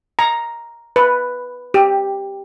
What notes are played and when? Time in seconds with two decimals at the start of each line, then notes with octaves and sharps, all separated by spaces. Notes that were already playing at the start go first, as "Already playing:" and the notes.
0.19 A#5
0.96 B4
1.74 G4